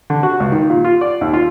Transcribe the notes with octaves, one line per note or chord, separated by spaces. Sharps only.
D3
F#4
C#2
D#3
A#2
F4
D5
D#2
F4